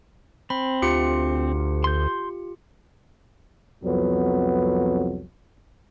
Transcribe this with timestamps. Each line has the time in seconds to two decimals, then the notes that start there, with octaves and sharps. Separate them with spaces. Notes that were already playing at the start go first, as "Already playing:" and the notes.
0.50 C4 B5
0.82 D2 F4 G4 C#7
1.84 C6 G6
3.84 C2 F2 F#3 B3